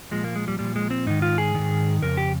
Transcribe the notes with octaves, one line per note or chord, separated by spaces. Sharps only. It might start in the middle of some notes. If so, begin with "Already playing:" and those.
A#2 F3 G#3
A#3
G#3
G3
A#2 F3 G3
G#3
C4
G#2 D#3 D#4
F4
G#4
G#2 D#3
F2 C#3 A#4
G4